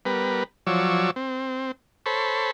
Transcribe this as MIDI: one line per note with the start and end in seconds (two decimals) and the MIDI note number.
0.05 0.44 55
0.05 0.44 59
0.05 0.44 70
0.05 0.44 71
0.67 1.11 53
0.67 1.11 54
0.67 1.11 73
0.67 1.11 74
0.67 1.11 88
1.16 1.72 60
2.06 2.51 69
2.06 2.51 72
2.06 2.51 73
2.06 2.51 83